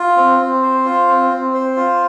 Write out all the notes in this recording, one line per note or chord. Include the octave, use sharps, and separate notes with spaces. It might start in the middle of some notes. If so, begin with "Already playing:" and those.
Already playing: F4
C4
C4
C5
F4
C4
C4
C5
F4